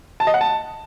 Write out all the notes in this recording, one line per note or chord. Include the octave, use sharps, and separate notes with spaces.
A5
D#5
F#5
A5